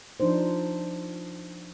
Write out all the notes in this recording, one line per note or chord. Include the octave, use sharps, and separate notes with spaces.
F3 D4 D#4 C5